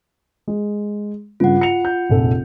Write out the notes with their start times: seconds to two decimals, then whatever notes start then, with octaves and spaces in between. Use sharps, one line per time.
0.48 G#3
1.40 G2 C#3 F4 F#5
1.61 C#7 F7
1.85 G6
2.09 F1 A#1 A4